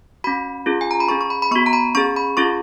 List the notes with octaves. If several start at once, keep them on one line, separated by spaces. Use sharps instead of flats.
C#4 F#4 B5
C#4 F4 G#4
G#5
A#5
B5
C#4 G#4 C#6
C#6
B5
B5
B3 F#4 C#6
A#5
B5
C#4 G#4 C#6
B5
C#4 F4 G#4 C#6